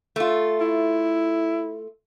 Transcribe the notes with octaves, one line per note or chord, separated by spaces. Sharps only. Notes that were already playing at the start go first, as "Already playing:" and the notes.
A3 F4
E4